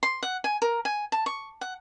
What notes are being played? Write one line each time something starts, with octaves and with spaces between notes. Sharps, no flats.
C6
F#5
G#5
A#4
G#5
A5
C#6
F#5